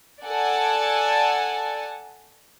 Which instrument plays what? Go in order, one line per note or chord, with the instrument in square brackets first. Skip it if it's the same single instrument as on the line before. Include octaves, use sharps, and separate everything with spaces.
[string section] A4 D5 F#5 G#5 A5